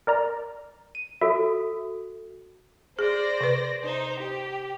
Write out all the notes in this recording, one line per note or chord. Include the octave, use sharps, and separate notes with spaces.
A#4 D5 A#5
D#7
F#4 A4 E5
G#4 C5 D5 A#6
C3 B4
D#4 C5
G4